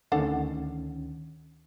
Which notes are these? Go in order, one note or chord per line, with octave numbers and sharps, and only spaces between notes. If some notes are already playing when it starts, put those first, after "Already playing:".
D2 D#3 C#4 D4 A4 F#5